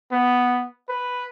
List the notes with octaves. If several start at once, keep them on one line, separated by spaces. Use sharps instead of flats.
B3
B4